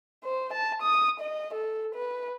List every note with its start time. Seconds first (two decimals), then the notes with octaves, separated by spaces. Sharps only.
0.24 C5
0.53 A5
0.82 D#6
1.20 D#5
1.54 A4
1.95 B4